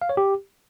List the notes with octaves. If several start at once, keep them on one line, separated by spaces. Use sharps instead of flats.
F5
C#5
G4